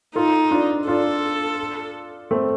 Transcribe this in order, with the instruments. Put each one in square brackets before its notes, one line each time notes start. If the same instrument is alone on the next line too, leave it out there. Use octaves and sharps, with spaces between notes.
[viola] D#4 [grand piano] F4 A4
[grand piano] D4 F4
[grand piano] D4 F4 [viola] A4
[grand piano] A3 C4